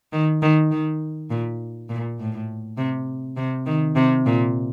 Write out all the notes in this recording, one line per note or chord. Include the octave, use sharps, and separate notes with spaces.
D#3
D#3
D#3
A#2
A#2
A2
C3
C3
D#3
C3
A#2